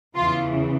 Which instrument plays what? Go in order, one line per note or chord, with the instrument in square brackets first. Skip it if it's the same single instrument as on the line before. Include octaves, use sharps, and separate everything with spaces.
[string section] E2 C#3 E3 F4